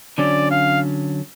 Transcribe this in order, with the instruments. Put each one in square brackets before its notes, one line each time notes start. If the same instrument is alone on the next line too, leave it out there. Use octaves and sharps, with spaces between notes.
[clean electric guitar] D3 F#3 C#4 [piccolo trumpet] D5
[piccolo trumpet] F5